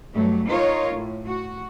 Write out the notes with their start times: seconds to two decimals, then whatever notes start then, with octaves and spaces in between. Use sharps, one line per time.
0.14 G2 F#3 A3
0.48 D#4 F4 A#4 C#5
0.93 A2
1.27 F#4